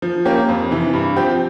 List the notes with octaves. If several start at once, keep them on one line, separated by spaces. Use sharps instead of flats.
F3
A#3 C#4 G4
F2
C3 E3
G2
F3 C4 G4